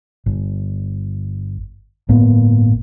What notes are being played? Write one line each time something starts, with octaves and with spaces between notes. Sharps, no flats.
G1
G1 A2 A#3 B3